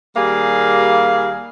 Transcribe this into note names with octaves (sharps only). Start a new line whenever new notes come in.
D#2 G3 A#3 G#4 F5